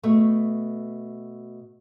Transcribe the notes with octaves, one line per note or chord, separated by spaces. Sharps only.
B2 A3